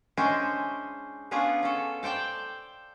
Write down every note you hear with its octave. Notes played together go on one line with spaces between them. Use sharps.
G#3 C#4 D4 E4 C5 G#5
B3 C#4 D4 F4 G#4 F#5
C#4 A4
A4 C5 D5 G5 A5